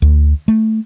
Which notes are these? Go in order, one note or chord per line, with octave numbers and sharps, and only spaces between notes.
D2
A3